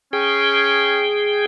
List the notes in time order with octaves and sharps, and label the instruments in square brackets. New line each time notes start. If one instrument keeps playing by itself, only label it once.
[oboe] C#4 [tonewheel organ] G#4 G5